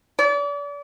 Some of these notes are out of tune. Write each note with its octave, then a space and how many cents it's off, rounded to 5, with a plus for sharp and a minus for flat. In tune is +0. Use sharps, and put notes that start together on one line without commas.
D5 -35